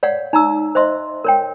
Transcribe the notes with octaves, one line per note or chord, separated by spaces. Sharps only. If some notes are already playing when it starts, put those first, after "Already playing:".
C#5 D5 F5 F#5
D#4 A#5 E6
C5 D#5 E5 C6
A#4 C#5 G5